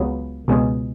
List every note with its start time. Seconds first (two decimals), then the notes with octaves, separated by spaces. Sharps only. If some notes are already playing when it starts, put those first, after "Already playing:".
Already playing: C#2 C#3 F#3 B3
0.48 C#2 B2 G#3 C#4 G#4